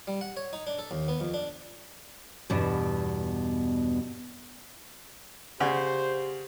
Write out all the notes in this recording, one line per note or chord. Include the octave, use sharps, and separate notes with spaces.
G3
F#5
C#5
D#4
D4
A4
D#2
B3
F2
D4
E2 G2 B2
C#3 G4 C5 D5 F#5 G#5